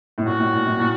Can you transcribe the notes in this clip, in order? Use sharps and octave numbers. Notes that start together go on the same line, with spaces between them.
A2
A#2 F#4
A2
A#2
A2
A#2